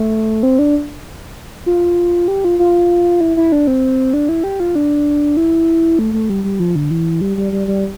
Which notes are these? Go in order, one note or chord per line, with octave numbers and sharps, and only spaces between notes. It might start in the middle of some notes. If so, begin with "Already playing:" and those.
Already playing: A3
C4
D4
F4
G4
F4
F4
E4
E4
D4
C4
D4
E4
G4
F4
D4
E4
A3
A3
G3
G3
F3
D3
E3
G3
G3
G3
G3